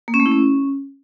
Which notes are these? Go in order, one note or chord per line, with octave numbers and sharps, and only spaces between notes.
A#3
C#4
A3
E4
C#4